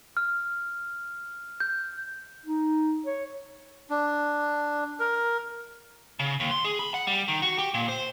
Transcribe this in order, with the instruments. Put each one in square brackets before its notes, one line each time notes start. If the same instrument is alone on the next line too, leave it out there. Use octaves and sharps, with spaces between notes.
[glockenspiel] F6
G6
[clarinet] D#4
C#5
[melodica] D4
A#4
[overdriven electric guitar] C#3
D#2
C6
G#4
B5
F#5
G3
D#3
F#4
G4
A#2
C5